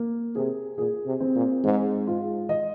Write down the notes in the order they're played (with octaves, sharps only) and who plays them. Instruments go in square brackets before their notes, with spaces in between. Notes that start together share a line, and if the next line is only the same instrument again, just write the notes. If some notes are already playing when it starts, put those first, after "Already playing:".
Already playing: [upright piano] A#3
[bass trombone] C3 [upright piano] G#4
[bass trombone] A#2 [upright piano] G#4
[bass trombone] C3
[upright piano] C4
[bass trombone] A#2
[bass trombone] G#2 [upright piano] G#3
[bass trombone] G#2 [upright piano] F4
[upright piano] D#5